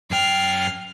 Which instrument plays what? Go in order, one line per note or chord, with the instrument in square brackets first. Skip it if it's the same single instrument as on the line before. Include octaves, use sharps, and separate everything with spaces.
[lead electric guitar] F#2 G5 [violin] F6 C7